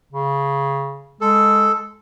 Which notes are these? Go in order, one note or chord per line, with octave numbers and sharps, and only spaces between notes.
C#3
G#3 A4